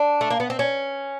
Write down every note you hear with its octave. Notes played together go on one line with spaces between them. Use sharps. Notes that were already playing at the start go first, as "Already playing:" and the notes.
Already playing: D4
A3
A#3
B3
C4
C#4